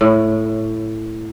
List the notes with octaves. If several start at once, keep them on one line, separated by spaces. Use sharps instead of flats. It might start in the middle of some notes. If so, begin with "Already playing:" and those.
A2